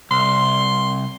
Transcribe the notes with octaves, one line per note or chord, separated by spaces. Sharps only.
C2 C6